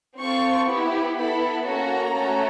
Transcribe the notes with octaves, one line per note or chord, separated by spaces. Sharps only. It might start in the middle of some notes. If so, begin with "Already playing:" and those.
C4 F4 A4 C#6
B3 E4 G4
B3 E4 A4 B5
A#3 C#4 F#4 A4 A#5
A3 C#4 F#4 A4